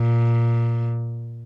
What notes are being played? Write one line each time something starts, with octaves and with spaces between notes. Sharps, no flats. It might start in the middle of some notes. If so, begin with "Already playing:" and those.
Already playing: A#2